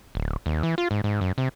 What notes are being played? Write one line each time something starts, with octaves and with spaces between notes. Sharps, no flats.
D1
D#2
E3
F4
G#2
G#2
F#2
C3